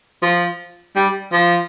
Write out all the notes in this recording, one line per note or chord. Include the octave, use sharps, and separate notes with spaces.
F3
G3
F3